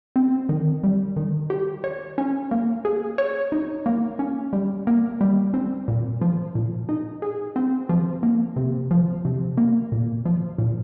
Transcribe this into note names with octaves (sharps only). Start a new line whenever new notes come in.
C4
D#3
G3
D#3
G4
C#5
C#4
A#3
G#4
C#5
D#4
A#3
C#4
G3
A#3
G3
C4
A#2
F3
A#2
D#4
G#4
C4
F3
A#3
C3
F3
C3
A#3
A#2
F3
A#2